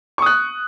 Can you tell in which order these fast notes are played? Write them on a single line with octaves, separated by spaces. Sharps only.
C#6 D#6 F#6